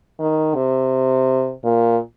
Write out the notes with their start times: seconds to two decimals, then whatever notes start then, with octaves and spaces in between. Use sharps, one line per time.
0.19 D#3
0.55 C3
1.65 A#2